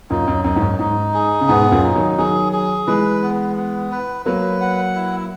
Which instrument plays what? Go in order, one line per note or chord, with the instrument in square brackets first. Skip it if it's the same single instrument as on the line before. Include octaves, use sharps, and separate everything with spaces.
[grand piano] F#2 A#2 [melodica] D#4
[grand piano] F#2
[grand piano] F#2 [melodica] D#4
[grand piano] G#2
F#2
[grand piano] G#2 [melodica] D#4
[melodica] G#4
[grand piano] C#3
[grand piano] G#2 B2 [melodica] B3
[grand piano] F#2 A#2
[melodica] D#4
[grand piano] D#3 F#3
[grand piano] D#3 F#3 [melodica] G#4
[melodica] G#4
[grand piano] E3 G#3 [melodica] B4
[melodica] B3
B3
B4
[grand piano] F#3 A#3 [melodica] B4
[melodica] F#5
E4